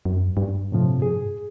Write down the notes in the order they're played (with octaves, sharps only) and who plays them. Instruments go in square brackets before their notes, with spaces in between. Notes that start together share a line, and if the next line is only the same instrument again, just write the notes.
[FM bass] F#2
G2
[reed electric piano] A2 C3 F3
G#4